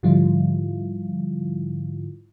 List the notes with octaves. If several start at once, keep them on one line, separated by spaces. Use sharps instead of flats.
G#2 D3 F3 G3 E4 F4